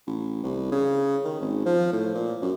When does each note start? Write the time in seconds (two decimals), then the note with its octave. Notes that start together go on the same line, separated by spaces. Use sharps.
0.07 A1
0.43 C2
0.72 C#3
1.24 D#3
1.41 G#1
1.66 F3
1.93 A2
2.15 A#2
2.42 F#2